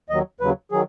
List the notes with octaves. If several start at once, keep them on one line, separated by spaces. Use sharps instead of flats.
D#2 D#3 F#3 D#5
D#2 C#3 F#3 B4
D#3 F#3 G#4